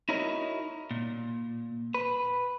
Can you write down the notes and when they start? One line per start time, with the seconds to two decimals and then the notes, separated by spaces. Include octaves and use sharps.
0.09 D#4 E4 F#4 A#4 C#5 D#5
0.91 A#2
1.94 B4